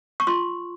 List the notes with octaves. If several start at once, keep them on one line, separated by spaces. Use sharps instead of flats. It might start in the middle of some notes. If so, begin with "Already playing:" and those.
C#6
F4 C6